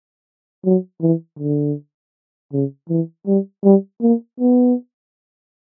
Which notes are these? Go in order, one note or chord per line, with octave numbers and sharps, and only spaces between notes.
F#3
E3
D3
C#3
E3
G3
G3
A#3
B3